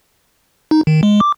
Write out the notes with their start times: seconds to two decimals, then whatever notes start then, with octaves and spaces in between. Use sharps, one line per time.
0.71 D#4
0.87 D#3
1.03 G#3
1.20 D6